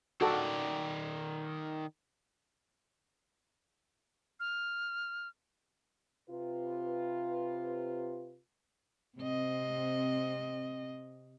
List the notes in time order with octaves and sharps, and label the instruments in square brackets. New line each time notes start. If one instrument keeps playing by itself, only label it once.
[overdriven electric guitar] D#3 D5 [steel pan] F#4 A4
[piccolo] F6
[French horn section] C3 F4 B4
[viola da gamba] C3 C4 D#5